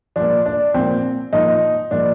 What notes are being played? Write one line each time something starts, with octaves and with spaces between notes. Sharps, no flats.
A#2 F3 D4
D4
A#2 F3 C4
A#2 F3 D#4
A#2 F3 D4